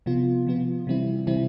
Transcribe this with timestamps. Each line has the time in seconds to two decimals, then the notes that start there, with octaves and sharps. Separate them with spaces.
0.06 C3 F3 B3 F4
0.47 C3 F3 B3 F4
0.87 C3 E3 G3 C4 E4
1.27 C3 E3 G3 C4 E4